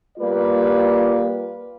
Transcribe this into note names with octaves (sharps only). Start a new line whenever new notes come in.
G3 A#3 F4 B4 D5